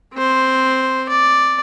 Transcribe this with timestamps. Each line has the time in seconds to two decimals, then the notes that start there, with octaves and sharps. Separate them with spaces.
0.14 C4 C5
1.09 D5